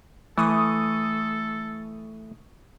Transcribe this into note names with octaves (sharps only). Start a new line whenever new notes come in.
E3 A3 A4 C#6 D#6